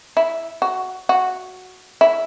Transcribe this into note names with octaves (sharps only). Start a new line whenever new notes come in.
E4
F#4
F#4
E4